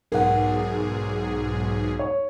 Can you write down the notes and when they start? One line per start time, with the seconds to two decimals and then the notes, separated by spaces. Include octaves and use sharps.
0.12 B1 G#2 G#4 A#4 F#5
1.99 C#5